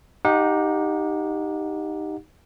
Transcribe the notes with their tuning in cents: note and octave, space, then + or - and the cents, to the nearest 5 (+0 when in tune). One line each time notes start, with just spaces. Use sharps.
D#4 +0 G4 +0 F#5 -35